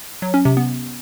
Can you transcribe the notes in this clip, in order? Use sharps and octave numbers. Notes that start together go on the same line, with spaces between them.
F#3
C#4
C3
B3